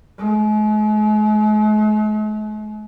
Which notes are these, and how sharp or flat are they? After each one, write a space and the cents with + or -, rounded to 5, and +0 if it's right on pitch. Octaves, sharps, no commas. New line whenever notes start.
G#3 +45